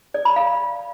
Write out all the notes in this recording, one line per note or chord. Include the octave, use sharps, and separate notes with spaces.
D5
B5
F5